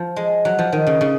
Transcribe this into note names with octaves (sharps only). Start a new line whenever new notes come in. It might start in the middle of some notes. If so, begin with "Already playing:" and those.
Already playing: F3
G#3
F#3
F3
D#3
C#3
C#3